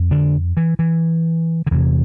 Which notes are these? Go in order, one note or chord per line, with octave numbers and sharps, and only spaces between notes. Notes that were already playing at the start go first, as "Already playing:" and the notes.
Already playing: F2
D3 D4
E3
E3
D3
E2 C3 E3